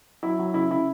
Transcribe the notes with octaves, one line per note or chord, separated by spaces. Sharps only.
F#3 E4
F#3
C#3 E4
C#3 E4